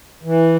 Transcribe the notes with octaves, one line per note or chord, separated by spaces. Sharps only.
E3